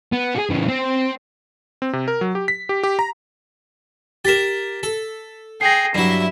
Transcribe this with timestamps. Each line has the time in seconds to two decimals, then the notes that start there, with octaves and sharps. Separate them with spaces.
0.13 B3
0.36 F#4 G#4
0.51 C#3 E3
0.69 C4
1.82 C4
1.93 C3
2.08 A#4
2.21 F#3
2.35 G4
2.48 B6
2.69 G4
2.83 G4
2.99 A#5
4.25 G4 A#4 A6 B6 E7
4.83 A4
5.61 G#4 G5 A#6 C7
5.95 G2 F#3 E4 E5